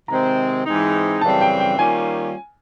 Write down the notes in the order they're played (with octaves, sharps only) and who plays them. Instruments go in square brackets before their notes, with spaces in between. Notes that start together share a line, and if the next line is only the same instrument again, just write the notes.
[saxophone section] C3 D#3 G#3 C4 [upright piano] A#5
[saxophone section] G#2 E3 G#3 C4 D#4
[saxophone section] F#2 C#3 E3 G3 C4 [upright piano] A5
[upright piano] G5
G5
[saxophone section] D#3 G3 A#3 C#4 F4 [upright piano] G#5